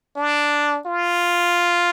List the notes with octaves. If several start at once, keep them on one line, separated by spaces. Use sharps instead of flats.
D4
F4